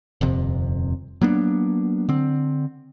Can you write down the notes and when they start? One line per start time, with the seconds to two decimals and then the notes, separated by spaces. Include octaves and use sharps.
0.21 D#1 F2 C3
1.21 F#3 A#3 B3 D4
2.09 D3 C4